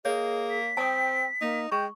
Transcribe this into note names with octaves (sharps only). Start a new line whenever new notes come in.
A#3 G#4 C#5 D#5
B6
C4 G5 A5 D#6
A#3 D#4
G#3 G5 C#6 G6